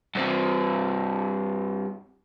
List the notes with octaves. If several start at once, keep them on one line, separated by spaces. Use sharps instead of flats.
G2 C4